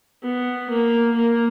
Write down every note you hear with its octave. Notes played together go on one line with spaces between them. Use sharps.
B3
A#3
A#3